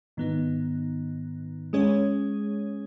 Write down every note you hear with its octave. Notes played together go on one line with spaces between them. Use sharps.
G#2 D#3 B3 D#4
G#3 C#4 G#4 C#5